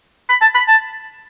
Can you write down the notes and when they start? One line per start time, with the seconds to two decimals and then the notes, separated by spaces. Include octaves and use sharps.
0.29 B5
0.41 A5
0.55 B5
0.68 A5